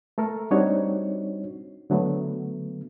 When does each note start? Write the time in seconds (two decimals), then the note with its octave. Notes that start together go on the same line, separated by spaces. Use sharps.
0.18 A3 A4 A#4
0.51 G3 C4 D4 D#4 F#4 C#5
1.90 D3 F#3 A3 B3